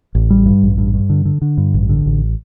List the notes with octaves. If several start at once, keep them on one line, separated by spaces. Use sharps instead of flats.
A1
G3
G2
A1
G2
G2
D3
D3
D3
G2
A1
D3
A1